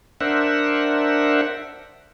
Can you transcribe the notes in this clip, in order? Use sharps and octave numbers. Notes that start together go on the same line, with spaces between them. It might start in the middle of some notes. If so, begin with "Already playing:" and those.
D4 A#4 C5 E5 F#5